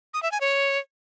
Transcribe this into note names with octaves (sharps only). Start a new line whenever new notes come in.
D#6
E5
G#5
C#5